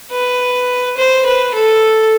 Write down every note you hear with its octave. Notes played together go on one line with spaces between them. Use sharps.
B4
C5
B4
A4